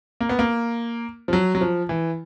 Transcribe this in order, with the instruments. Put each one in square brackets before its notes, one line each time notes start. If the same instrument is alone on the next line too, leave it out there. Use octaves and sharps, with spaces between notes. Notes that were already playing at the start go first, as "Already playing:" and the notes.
[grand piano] A#3
B3
A#3
F3
F#3
F#3
F3
E3